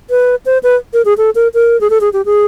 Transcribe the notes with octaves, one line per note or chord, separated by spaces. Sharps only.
B4
C5
B4
A#4
G#4
A4
A#4
A#4
G#4
A4
G#4
G4
G#4